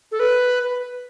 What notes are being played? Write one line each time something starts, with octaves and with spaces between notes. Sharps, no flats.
A4
B4